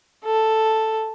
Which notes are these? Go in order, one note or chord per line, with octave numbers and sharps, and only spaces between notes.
A4